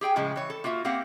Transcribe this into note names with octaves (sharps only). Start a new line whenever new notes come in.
G4 G#4 G5 G#5
A2 C#3 F3 G#3
E3 C#5
A4
A#3 F4 F#4 E5
A#3 C4 G4 F5 F#5